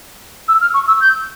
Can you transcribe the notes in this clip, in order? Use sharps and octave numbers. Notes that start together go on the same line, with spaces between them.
E6
F6
C#6
E6
G6